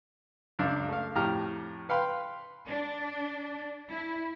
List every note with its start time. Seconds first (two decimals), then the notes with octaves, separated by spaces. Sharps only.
0.59 C#2 F#2 D4 F5
0.88 A3 F5
1.15 F2 A2 G4 A#5 F6
1.89 B4 F5 G5 B5 C6
2.68 D4
3.90 E4